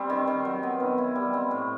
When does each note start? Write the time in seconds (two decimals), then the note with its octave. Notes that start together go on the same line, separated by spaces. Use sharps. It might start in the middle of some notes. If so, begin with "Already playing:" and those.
Already playing: G3 C4
0.10 D#3
0.27 D#3
0.45 F#3
0.63 B3
0.80 D#3
0.98 E4
1.15 G3
1.33 C4
1.51 A2